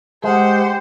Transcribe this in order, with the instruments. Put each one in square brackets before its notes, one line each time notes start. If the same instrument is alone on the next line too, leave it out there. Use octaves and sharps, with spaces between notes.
[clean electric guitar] G#3 [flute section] G4 F#5 [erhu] C5